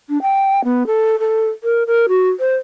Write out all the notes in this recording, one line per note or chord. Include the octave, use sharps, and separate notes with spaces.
D4
G5
B3
A4
A4
A#4
A#4
F#4
C5